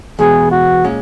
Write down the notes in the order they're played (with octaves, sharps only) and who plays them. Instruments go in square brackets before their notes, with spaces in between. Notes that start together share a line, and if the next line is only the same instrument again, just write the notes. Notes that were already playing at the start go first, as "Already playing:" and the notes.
[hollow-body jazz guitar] E2 B2 G#3 B3 [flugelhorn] G#4
[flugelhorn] F#4
[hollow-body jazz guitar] A#2 G#3 C#4